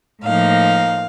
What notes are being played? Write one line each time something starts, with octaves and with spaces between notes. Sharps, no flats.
A2 F3 A#3 D#4 F5